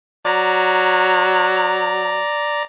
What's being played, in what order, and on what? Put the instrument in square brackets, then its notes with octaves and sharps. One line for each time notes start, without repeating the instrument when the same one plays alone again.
[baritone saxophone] F#3 [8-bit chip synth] D5 A#5